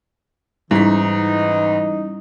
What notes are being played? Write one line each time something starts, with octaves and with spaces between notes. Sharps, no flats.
G#2 E3 G3 C#4 D#4 E4 B6